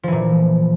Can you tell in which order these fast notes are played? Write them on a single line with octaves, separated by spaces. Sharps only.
F3 E3 A#2